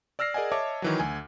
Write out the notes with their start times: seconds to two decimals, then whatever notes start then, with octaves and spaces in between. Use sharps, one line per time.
0.19 D5 E6 F6 A#6 C7
0.34 G#4 A#4 D5 D#5 F#5 G#5
0.52 C#5 D#5 E5 A5 D6 G#6
0.82 D#3 E3 F#3
1.00 D2 G#5